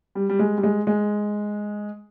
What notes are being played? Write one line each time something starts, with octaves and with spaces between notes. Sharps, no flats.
G3
G3
G#3
G3
G#3
G#3